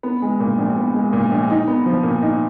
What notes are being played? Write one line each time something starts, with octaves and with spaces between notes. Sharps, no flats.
B3
G#3
A#2
A#1
B3
G#3
A#2
A#1
D#4
B3
F3
A#2
D#4